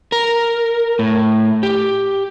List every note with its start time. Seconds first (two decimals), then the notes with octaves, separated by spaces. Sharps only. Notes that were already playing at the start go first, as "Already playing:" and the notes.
0.12 A#4
0.99 A2
1.63 G4